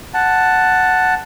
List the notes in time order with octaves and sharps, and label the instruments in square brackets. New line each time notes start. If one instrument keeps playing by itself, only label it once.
[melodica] F#5 A5